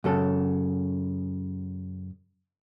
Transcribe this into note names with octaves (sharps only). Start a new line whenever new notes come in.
F#2 C#3 A4